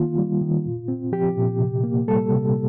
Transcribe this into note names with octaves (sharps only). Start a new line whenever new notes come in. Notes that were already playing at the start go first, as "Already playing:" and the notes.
Already playing: D#3 A#3 F4
G3
D#3
A#2
C4
F3 G4
A#2
C3
A#3
G3 A4
C3